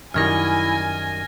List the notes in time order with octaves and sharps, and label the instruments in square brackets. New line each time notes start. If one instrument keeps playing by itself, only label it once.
[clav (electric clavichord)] F#2 D#3 G3 [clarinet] E4 [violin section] G#5 [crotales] F6 G#6 A#6